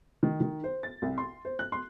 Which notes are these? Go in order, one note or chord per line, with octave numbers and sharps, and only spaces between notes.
D#3
D#3
C5
A6
C2
C6
C5
F#6
C6